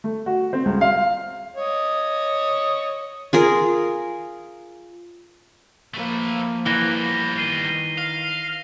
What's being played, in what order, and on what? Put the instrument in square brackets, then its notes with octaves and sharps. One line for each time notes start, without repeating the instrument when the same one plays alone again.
[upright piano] A3
F#4
C4
C#2
F5
[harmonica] C#5 D#5
[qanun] F4 G#4 A#4
[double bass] F3 A#3 [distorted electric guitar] A3 B4
[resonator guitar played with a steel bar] E3 [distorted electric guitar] G3 B3 [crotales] A#6 G7
[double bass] D#3 [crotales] C7 D#7 G7
[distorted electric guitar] F5